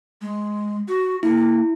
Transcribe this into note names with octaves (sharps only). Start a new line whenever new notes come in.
G#3
F#4
A#3 E4